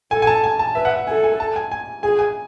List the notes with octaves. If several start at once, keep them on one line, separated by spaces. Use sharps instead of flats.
A4 G#5
G#5
A5
G#5
A5
B4 E5
F#5
E5
A4 G#5
G#5
A5
G#5
G#5
G#4 G#5
G#5